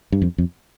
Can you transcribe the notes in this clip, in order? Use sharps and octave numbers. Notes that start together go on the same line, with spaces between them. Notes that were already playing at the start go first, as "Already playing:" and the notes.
G2
F2
F2